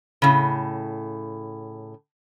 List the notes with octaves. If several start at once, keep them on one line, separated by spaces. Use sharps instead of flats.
A2 C#3